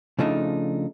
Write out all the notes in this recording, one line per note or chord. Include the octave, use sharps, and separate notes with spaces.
C#3 F3 A3 D4 D#4